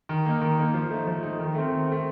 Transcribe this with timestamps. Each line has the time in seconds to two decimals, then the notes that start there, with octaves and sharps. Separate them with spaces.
0.09 D#3
0.26 A#3 D#4
0.41 D#3
0.58 A#3 D#4
0.74 F3
0.90 A3 D#4
1.07 F3
1.23 A3 D#4
1.40 D#3
1.55 A3 C4
1.72 D#3
1.88 A3 C4